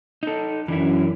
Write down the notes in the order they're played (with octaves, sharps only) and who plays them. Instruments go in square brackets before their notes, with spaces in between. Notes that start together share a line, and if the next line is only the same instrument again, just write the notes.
[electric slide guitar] D#4 A4
[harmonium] F#2 [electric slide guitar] E3 D4 E4